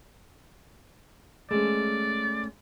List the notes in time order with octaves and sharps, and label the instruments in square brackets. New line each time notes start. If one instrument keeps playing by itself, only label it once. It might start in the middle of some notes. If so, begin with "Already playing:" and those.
[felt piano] G#3 [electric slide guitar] A3 C#4 [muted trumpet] D5